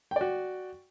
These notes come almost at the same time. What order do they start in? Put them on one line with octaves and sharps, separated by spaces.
G5 D5 F#4